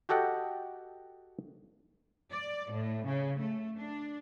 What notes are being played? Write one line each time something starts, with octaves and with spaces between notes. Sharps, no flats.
F#4 G4 A4 D#5 F#5 G5
D5
A2
C#3
A3
D4